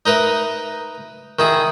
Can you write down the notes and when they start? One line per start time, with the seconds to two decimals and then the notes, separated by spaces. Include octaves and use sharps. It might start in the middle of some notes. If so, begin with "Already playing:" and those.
0.06 D#4 A#4 B4 E5
1.39 D#3 E4 G#4